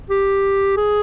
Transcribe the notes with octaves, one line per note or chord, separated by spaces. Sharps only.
G4
G#4